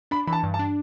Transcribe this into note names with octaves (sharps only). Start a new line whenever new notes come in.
D4 B5
E3 B5
A5
G2
A5
D4